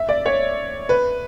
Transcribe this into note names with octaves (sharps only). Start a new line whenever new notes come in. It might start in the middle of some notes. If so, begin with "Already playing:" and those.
Already playing: E5
D5
C#5
B4